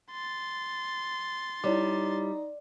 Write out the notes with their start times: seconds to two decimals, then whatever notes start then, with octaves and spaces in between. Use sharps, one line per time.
0.11 C6 A6
1.64 G3 D#4 E4 C#5 D6